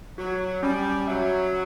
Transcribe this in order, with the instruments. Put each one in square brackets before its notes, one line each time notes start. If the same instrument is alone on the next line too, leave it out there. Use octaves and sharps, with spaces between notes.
[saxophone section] F#3 [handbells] F#4
[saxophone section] G3 [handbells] C#4
[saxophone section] F#3 [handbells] E5